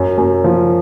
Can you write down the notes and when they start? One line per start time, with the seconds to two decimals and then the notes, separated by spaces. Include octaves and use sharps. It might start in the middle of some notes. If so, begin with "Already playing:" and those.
Already playing: F#2
0.18 F#2
0.44 F3